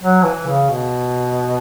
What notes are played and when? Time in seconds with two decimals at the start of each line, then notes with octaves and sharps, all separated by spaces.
0.01 F#3
0.23 E3
0.47 C#3
0.69 B2